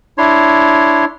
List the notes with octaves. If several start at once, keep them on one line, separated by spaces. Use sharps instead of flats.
D4 E4 C#5 C6